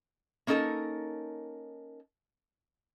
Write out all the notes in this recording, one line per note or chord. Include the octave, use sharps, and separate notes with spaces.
A#3 C#4 D#4 A4 A#4